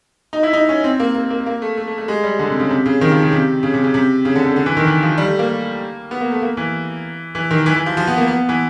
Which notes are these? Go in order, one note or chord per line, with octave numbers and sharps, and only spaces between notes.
D#4
E4
D#4
C#4
C4
A#3
A#3
A#3
A#3
A3
A3
A3
A3
G#3
G3
D3
C3
C#3
C3
C#3
D#3
F3
C#3
C3
C#3
C3
C#3
C3
C#3
D3
D3
D3
E3
D#3
E3
F3
G3
A3
A#3
B3
A#3
A3
A#3
E3
E3
D#3
E3
E3
F3
F3
B3
A#3
B3
E3